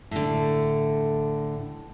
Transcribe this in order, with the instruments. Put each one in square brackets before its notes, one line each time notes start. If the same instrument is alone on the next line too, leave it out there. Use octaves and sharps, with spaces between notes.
[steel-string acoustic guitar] A2 D3